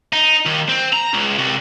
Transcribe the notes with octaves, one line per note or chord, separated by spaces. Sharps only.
D#4
D#2
C4
A#5
C#2
C2